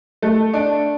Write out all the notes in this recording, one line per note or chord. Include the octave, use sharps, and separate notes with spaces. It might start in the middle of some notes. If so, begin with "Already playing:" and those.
A3
D4